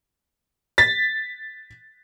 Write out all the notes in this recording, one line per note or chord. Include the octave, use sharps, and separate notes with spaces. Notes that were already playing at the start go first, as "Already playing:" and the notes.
A6 B6